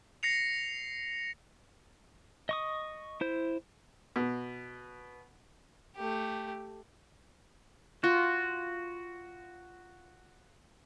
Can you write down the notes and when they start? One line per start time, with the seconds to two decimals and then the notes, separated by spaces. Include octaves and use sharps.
0.23 A#6 C7 C#7 F7
2.49 D#5 C#6 D#6
3.21 E4 C5
4.16 B2
5.97 A3 G4
8.04 F4 F#4